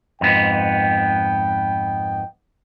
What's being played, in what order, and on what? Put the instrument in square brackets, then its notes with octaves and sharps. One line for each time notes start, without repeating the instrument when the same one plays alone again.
[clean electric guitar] F2 G#2 B3 [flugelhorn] G5